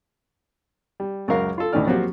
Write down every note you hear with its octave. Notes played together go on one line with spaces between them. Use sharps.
G3
C#2 F#2 F#3 A#4 F5
F4 A4
D2 A2 D#3 C#4 D5 F6
F3 F#3 A#3 C4 F#4 G4